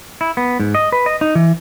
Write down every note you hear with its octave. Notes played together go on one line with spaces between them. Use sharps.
E4
B3
G#2
D#5
B4
D#5
D#4
E3